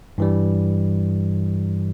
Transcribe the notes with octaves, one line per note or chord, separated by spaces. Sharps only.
G2 E3 G3